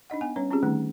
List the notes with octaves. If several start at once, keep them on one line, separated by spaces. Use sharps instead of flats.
D4 D#4 D#5 F#5
B3 F#5 G#5
G3 C#4 B4 C#5
C4 C#4 F4 G4 G#4
D3 D#3 G3 A3 D#4